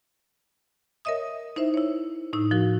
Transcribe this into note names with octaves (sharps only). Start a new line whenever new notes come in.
A#4 C#5 D#5 E5 D#6
D#4 E4 C5 E5
E4 C#5
A2 D#4 E6
F3 F#4 A#4